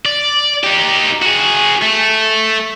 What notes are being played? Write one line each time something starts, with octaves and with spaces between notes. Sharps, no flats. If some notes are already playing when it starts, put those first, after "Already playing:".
D5
D#4 G4
F#4 G#4
A3